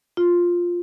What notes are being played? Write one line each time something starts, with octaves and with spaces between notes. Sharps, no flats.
F4